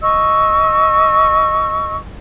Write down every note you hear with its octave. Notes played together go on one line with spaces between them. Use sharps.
D#5 C#6 E6